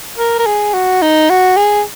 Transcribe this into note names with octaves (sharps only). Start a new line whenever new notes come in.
A#4
A#4
G#4
F#4
D#4
F#4
G#4